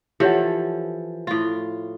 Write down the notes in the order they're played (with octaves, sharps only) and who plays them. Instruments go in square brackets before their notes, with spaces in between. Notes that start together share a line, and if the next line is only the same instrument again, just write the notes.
[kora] E3 F3 A4 [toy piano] G4 C#5 F#5
[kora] A2 F4